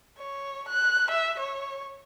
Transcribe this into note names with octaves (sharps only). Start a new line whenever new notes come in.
C#5
F#6
E5
C#5